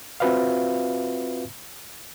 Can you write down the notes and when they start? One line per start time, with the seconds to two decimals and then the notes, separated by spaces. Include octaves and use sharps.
0.20 C4 F4 F#4 B4 E5 F5